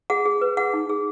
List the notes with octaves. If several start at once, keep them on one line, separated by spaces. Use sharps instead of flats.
G#4 F#5
G#4
B4
G#4 F#5
D#4
G#4